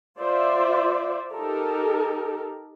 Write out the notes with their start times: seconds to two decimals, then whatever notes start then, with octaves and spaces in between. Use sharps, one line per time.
0.19 F4 C5 D5 E5
1.32 D#4 G4 A4 A#4